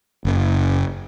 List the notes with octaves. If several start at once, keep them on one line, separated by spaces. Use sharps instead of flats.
F#1